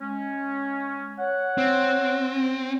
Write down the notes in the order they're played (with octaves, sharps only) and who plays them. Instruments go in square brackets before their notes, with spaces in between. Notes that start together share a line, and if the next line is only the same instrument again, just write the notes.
[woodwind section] G#3 C#4
C#5 F#5
[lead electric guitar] C4